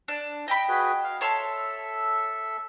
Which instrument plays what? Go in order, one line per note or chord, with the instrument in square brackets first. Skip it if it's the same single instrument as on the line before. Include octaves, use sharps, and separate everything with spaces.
[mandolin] D4
D#5 G5 B5
[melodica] F#4 G#4 B4
F5
[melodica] A4 E5 [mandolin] C#5 A5 C6